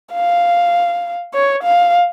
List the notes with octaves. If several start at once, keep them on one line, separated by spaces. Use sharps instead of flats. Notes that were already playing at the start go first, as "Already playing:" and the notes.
F5
C#5
F5